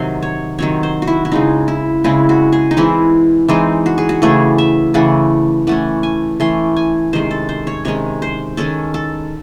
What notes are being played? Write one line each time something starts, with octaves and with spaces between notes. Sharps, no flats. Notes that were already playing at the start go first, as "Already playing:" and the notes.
Already playing: C3 D#3 F#3 C4 C6
C#5
C3 D#3 F#3 C4 C#5
C5
F#4
E4
E4
C#3 G#3 C4 D#4
E4
C#3 G#3 C4 E4
F#4
G#4
D#4
E3 G#3 C4 E4
E3 G#3 C4 D#4
F#4
G#4
F#4
C#3 E3 A3 G#4
E5
C#3 E3 A3 F#5
E3 A3 C#4 F#5
G#5
E3 A3 C#4 C6
G#5
C3 D#3 G#3 C#4 C5
A4
C5
C#5
C3 D#3 G#3 C#4 C#5
C5
D#3 G#3 C#4 A4
A4